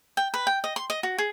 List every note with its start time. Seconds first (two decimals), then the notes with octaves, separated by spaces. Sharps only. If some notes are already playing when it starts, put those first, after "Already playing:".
0.17 G5
0.34 B4
0.47 G5
0.64 D#5
0.76 C6
0.90 D#5
1.03 F#4
1.18 G#4